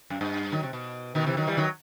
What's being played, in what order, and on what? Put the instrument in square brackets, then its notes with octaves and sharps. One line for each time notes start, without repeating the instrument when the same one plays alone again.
[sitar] F#2
G2
D#3 F#3
C3
B2
B2 D#3
C3 E3
D#3 F#3
E3 G3
D#3 F#3